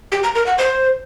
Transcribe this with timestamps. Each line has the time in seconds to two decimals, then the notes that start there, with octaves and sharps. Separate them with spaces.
0.12 G4
0.23 A#5
0.35 A#4
0.46 F#5
0.58 C5